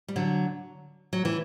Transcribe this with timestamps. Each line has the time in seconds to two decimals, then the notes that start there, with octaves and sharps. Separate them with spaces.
0.08 G3
0.16 D3 F#3
1.13 F#3
1.25 E3